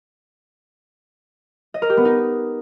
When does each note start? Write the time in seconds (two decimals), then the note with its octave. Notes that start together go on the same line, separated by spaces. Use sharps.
1.74 D#5
1.82 A#4
1.90 G4
1.97 B3
2.05 D#4